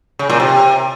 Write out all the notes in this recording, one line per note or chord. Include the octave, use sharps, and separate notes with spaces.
C#3
A#2
C3